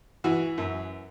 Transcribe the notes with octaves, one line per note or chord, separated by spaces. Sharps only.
E3 F#4
F#2